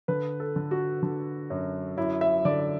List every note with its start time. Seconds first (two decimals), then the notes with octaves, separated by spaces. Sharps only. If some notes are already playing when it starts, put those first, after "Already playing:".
0.08 D3 B4
0.40 A4
0.56 D3
0.71 F#4
1.03 D3
1.50 F#2
1.97 F#2 E4
2.21 E5
2.45 D3 D5